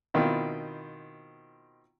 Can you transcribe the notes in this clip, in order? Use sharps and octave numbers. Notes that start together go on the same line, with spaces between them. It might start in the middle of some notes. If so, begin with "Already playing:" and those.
B2 D#3 C4 E4 F4